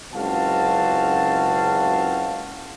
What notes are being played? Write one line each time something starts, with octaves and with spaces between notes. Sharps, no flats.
F#1 C#2 C4 F#4 F5 A5